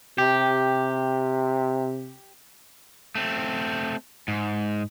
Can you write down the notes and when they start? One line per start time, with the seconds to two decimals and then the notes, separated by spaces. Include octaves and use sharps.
0.18 C3 G4
3.15 A3 C4
4.28 G#2